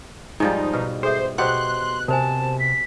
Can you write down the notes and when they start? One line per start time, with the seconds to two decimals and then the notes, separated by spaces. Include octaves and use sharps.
0.40 G#2 F3 G3 D#4
0.73 B2 B4
1.03 G#4 A4 C5 E5
1.38 B2 G4 C5 F#5 A#5 C6 F#6
2.08 C3 A#4 C5 G#5 A5
2.59 B6